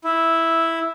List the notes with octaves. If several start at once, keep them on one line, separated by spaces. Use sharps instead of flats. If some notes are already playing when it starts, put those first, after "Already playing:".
E4